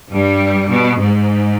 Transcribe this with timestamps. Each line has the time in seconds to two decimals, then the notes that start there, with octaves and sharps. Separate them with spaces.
0.12 G2 G3
0.70 B2
0.99 G#2